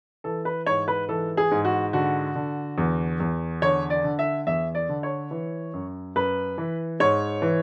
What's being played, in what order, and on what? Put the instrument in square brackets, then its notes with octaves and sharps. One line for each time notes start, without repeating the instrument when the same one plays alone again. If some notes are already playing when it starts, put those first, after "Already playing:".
[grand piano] E3 A4
B4
G#2 C#5
B4
E3 A4
G#4
G#2
F#4
D3 F#4
D3
E2
E2
D3 C#5
D5
D3
E5
E2 E5
D5
D3
C#5
E3
F#2
F#2 B4
E3
G#2 C#5
E3